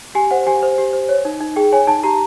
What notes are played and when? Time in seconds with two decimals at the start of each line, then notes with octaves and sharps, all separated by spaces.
0.15 G4 G#5
0.31 C5 F#5
0.47 G4 G#5
0.63 C5
0.78 G4
0.93 C5
1.09 C#5
1.25 D#4
1.40 D#4
1.56 G#4 G5
1.72 C#5 G#5
1.87 D#4 A5
2.03 G4 A#5